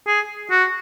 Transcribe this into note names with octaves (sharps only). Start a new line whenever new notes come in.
G#4
F#4